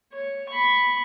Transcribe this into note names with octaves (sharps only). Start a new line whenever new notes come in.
C#5
B5 C#6